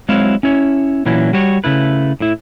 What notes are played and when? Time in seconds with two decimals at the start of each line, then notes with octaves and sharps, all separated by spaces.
0.09 F#3 G#3 C4 E4 C#5 F5
0.43 C#4 E4 C#5
1.06 A#2 E3 F#3 C#4 E4
1.33 G3 F#4 C#5
1.64 C#3 A3 E4 B4
2.20 A2 E4